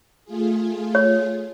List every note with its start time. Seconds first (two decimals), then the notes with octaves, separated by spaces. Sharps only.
0.24 A3 F4 G#4
0.95 C#5